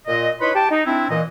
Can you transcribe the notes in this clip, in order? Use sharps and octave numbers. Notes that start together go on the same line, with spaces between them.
A#2 D#5
D#4 E4 B4 C#5 B5 C6
G4 G5 A5
D#4
C4 D4 E4
A#2 E3 D#5